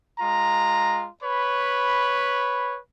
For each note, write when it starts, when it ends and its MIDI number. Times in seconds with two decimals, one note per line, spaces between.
0.19 1.07 56
0.19 1.07 65
0.19 1.07 82
1.23 2.78 71
1.23 2.78 73
1.23 2.78 83